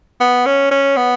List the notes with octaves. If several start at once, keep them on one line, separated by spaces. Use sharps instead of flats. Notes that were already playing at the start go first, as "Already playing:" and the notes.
B3
C#4
C#4
B3